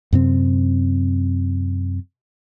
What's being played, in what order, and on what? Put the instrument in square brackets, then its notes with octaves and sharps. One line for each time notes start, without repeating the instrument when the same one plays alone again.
[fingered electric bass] F#2 C3 C4